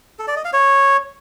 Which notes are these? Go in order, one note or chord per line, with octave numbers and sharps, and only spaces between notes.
A4
D5
D#5
F5
C#5